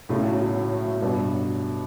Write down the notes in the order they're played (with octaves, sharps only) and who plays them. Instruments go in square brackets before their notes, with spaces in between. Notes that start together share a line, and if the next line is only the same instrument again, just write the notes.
[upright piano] B1 [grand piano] A2 C#3
[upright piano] F#3
B1
F#3
A2
F#3
[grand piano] G2 B2 [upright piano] F#3
[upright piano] F#3